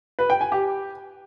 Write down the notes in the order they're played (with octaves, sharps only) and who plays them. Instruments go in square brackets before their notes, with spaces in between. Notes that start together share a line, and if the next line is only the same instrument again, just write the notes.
[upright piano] B4
G5
G#5
G4